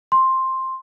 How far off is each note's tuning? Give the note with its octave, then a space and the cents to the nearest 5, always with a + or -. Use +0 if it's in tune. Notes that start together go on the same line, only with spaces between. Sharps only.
C6 +5